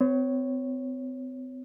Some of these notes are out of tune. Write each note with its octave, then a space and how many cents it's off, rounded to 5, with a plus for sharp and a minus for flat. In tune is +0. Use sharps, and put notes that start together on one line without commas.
C4 -40 C#5 +0